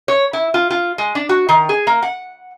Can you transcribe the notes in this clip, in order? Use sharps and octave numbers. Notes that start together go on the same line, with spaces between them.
C#5
E4
F4
F4
G#3
D4
F#4
D#3
G#4
A#3
F#5